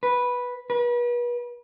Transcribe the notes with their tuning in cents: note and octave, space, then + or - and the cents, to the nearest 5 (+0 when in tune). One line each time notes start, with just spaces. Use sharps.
B4 -5
B4 -40